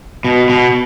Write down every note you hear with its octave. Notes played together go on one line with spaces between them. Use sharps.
B2
B2